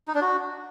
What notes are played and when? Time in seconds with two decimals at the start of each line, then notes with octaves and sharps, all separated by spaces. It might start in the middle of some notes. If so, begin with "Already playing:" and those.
0.08 D#4
0.15 D4
0.21 F#4